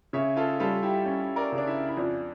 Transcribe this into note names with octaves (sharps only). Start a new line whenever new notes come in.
C#3 C#5 E5
F4 A4
G3 F4 A4
E4 G4
C#4
A#4 D5
C#3
D4
E4
E4
F2 D4